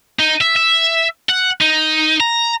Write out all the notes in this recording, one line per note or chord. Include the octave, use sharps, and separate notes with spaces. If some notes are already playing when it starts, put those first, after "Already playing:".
D#4
E5
E5
F#5
D#4
A#5